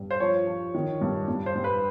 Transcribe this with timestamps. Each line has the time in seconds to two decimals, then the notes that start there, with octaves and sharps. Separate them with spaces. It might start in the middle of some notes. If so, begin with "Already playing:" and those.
Already playing: G2
0.11 C5
0.20 F3 C#5
0.47 F3
0.75 D#3
1.01 G2
1.28 G2
1.46 C5
1.55 G2
1.64 B4